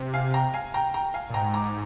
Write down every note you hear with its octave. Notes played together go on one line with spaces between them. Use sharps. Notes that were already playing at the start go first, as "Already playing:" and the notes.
Already playing: C3
F5 G#5
G5 A#5
F5 G#5
G5 A#5
G5 A#5
F5 G#5
A#2
G#2 G5 A#5
A#5 D6